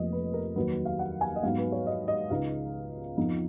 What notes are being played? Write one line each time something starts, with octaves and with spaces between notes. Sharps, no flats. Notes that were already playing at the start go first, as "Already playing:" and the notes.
Already playing: F1 F2 F3 A#3 D#5
B4
A#4
F1 D#2 D#3 F#3 B4
F5
F#5
G#5
D#5
G#2 F#3 B3 D#4 F5
B4
C#5
D#5
D#5
C#2 C#3 G#3 D#4 F5
F2 F3 B3 D#4